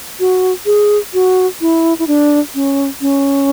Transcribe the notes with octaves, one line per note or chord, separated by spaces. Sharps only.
F#4
G#4
F#4
E4
E4
D4
C#4
C#4